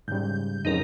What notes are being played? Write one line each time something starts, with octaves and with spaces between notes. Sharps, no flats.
G#2 C#3 G3 G6
F2 C#3 F#3 D#4 A#4